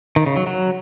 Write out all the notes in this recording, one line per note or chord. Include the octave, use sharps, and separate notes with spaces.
D#3
C#3
F#3
F#3